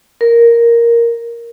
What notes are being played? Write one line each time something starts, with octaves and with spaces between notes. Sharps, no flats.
A#4